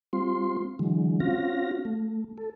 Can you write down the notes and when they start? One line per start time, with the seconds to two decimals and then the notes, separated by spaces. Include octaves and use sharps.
0.13 G3 C4 F4 C6
0.79 D3 E3 F#3 G#3
1.20 C4 C#4 F4 F#4 F5 A#6
1.85 A3
2.38 A4